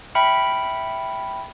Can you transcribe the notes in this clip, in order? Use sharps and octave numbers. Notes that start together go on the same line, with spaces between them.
E5 G5 B5 F6 C#7